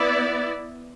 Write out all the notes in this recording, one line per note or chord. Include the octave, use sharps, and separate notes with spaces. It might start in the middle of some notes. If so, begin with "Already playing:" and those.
Already playing: B3 E4 D5